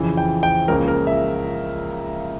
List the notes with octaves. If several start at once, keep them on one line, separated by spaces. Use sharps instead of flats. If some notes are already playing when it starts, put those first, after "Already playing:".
Already playing: F2 C#3 E3
G5
G5
C#2 C#3 F3 A#3 A#4
A#4
E5